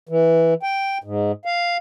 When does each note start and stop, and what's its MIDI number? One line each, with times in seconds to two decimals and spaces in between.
0.09 0.54 52
0.63 0.98 79
1.04 1.32 44
1.45 1.77 77